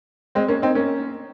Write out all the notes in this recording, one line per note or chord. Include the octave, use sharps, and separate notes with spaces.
G#3 C4
A#3 C#4
C4 D#4
A#3 C#4